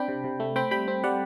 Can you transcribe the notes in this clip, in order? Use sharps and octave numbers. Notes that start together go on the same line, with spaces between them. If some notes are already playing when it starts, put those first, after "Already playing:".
Already playing: C4 D4 G5 B5
C3
C3
A3
C4 G5 B5
G3 G5 B5
C4
G3 D5 F#5